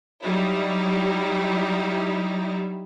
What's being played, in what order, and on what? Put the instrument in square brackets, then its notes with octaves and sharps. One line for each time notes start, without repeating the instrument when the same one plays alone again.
[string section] F#3 G3 D#4 E4